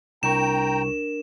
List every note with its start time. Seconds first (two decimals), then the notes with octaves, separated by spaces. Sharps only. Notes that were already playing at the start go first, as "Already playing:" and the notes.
0.23 C2 D4 A#4 G5 A#5 C#6 E7